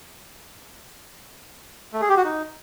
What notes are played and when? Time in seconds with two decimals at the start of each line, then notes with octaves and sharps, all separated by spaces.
1.94 A3
2.01 G#4
2.09 G4
2.17 F#4
2.25 D#4